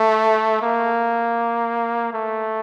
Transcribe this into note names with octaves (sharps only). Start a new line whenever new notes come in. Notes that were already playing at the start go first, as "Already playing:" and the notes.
Already playing: A3
A#3
A3